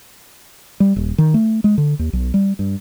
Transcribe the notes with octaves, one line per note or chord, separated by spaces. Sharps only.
G3
D#1
D#3
A3
G#3
D3
D#2
B1
G3
G2